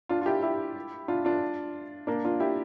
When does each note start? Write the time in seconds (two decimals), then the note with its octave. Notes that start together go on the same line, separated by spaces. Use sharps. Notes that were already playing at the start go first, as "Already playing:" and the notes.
0.09 D4 F4
0.21 F4
0.26 E4 G4
0.42 E4 G4
1.08 D4 F4
1.25 D4 F4
2.07 A#3 D4
2.25 D4 F4
2.40 E4 G4